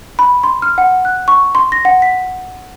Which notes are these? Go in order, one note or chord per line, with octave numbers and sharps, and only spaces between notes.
B5
C6
F6
F#5
F#6
C#6
C6
A#6
F#5
B6